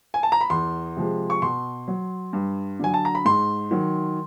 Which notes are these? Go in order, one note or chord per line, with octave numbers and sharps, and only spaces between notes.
G#5
A5
A#5
B5
E2 C6
C3 F3 G#3
C#6
B2 C6
F#3
G2
D3 F#3 G#5
A5
A#5
B5
G#2 C6
D#3 F#3